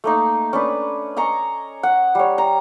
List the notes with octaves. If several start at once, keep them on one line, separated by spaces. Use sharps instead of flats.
A3 A#3 D#4
C#4 D4 B4
D#5 G#5 A#5 C#6
F#5
G3 C#5
A#5